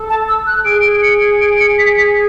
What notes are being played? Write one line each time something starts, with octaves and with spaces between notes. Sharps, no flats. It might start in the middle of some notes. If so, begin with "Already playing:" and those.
Already playing: A4
A5
E6
F#6
G#4 D7
D7
C#7
D7
C#7
B6
B6